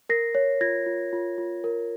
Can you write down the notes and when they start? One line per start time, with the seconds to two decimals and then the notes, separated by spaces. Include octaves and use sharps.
0.09 A#4 A#6 C7
0.35 C#5
0.61 F4 G#6 A#6
0.86 F4
1.13 F4
1.38 F4
1.64 A#4